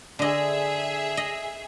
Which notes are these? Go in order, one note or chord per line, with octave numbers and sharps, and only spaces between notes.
D3 G#4 D#5 E5
D#5